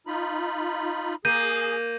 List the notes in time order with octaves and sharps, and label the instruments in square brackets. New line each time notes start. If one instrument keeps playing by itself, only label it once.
[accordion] D#4 F4 B5
[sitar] A#3 [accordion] G#4 [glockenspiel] G6 D#7